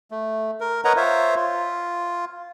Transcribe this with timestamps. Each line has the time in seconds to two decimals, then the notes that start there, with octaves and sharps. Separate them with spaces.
0.11 A3
0.60 A#4
0.85 A#4 B4 C#5 D#5 F#5 A#5
0.97 F4 C5 C#5 E5
1.36 F4